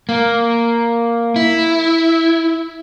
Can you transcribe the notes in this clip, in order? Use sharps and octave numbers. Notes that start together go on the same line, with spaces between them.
A#3
E4